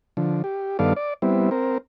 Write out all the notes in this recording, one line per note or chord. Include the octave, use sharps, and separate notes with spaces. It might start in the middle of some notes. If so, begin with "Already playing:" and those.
D3 F3
G4
G2 D#3 B3 A4 D5 F5
D5
G3 B3 C4 E4
C4 A#4